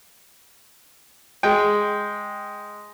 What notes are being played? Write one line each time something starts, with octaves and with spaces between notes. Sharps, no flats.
G#3 G5